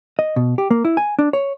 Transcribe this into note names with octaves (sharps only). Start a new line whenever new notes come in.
D#5
B2
G4
A#3
E4
G#5
D4
C#5